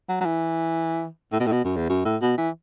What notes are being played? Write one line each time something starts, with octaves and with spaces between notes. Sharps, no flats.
F#3
F#3
E3
A2
B2
A2
B2
F#2
E2
F#2
A2
B2
E3